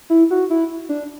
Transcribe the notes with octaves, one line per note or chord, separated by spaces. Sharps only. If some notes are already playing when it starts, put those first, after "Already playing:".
E4
F#4
E4
D4